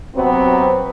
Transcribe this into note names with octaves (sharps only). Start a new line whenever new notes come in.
C3 F#3 B3 C4